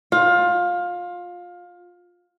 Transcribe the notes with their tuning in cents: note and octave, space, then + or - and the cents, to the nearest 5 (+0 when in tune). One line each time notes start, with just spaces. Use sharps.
F4 +20